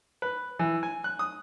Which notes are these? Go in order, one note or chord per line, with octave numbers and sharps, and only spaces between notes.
B4
E3
G#5
F#6
D#6